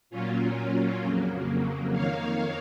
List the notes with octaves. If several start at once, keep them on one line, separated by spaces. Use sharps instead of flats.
A#2 F#3 A#3 C#4 F4
F2 C#3 F#3 A#3
F2 D#3 A#3 C#5 F5